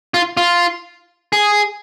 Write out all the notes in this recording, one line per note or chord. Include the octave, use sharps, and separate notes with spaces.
F4
F4
G#4